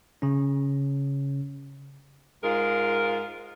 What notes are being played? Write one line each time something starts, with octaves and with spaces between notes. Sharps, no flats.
C#3 C#4
G#2 G#3 F4 A#4